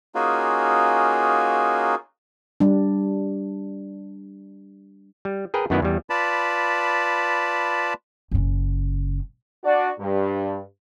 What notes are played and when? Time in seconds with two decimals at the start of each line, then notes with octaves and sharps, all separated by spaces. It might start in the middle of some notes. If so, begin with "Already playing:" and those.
0.15 A#3 C#4 D#4 F4 F#4 G#4
2.60 G3 D4
5.25 G3
5.54 G#4 A#4 B4 G5
5.70 F#2 D#3 B3 E4 B4 D5
5.82 E2 G3
6.10 F4 B4 D5 A5 B5
8.31 F#1 C#3
9.64 D4 F#4 D5
9.99 G2